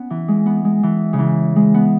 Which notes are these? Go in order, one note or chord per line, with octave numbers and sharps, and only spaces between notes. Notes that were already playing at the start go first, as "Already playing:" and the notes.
Already playing: B3 C#4
E3
G#3
B3
G#3
E3
C#3
E3
G#3
B3